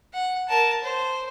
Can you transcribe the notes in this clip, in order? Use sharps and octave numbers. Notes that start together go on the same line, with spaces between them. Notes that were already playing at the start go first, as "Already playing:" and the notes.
F#5
A#4 A5
C5